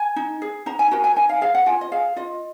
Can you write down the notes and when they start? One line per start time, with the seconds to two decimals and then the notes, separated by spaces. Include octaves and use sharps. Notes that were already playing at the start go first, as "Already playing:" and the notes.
Already playing: G#5
0.16 D#4
0.42 G#4
0.66 D#4 A#5
0.79 G#5
0.91 F#4 A#4 A#5
1.04 G#5
1.16 D#4 G#5
1.29 F5
1.41 G#4 F5
1.55 F#5
1.66 F4 G#5
1.81 D#5
1.92 G#4 F5
2.16 F4 D#5